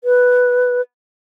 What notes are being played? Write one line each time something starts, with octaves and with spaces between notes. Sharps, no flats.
B4